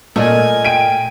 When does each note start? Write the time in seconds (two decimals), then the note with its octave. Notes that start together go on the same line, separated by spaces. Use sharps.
0.16 A#2 A3 A4 A#4 D5 D#5 G#5
0.65 G5 D7 D#7